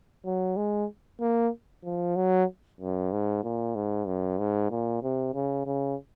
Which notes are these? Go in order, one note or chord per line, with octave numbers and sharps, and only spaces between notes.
F#3
G#3
A#3
F3
F#3
F#2
G#2
A#2
G#2
F#2
G#2
A#2
C3
C#3
C#3